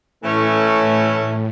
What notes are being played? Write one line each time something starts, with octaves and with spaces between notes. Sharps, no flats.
A2 E3 A3 C#4
A2